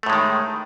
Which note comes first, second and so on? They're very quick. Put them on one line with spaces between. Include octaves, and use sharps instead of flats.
A3 A2 G#3 D#3